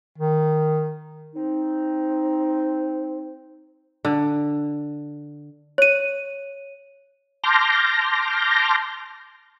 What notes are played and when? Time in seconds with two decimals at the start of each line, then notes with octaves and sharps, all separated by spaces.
0.18 D#3
1.35 C4 D#4
4.05 D3
5.78 C#5 D#7
7.44 A5 C6 D6 F6 G6 A#6